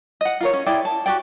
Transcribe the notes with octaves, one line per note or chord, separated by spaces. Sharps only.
D#5 F#5
F4 A#4 C#5
C#4
E4 G#4 D5 G5
A5
F#4 G4 D5 G5